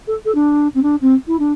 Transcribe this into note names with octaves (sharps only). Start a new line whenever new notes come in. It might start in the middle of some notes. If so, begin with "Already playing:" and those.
A4
A4
D4
C4
D4
C4
E4
D4